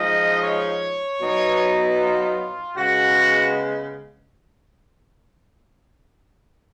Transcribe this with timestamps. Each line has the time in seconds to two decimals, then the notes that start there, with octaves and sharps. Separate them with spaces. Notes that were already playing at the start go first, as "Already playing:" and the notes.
Already playing: F3 G#3 D#4 D#5
0.43 C#5
1.21 B2 F#3 B3 D#4
1.99 F4
2.76 C#3 G#3 B3 F#4